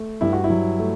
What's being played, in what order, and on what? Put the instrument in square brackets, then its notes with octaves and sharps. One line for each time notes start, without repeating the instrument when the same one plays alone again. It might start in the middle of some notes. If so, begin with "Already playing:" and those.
Already playing: [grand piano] A3
G2 E4
F#4
E4
F#3
A3